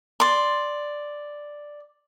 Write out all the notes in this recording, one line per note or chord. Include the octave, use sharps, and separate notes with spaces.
D5 C6